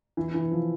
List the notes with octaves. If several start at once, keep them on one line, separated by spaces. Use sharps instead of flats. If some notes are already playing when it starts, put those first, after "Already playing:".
E3
E3
F3